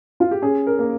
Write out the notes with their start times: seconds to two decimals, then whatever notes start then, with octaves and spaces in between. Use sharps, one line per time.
0.20 F4
0.31 G4
0.42 C#4 G#4
0.67 A#4
0.79 A#3